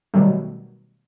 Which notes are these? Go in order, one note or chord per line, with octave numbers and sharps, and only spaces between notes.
B2 D#3 F#3 G3 A3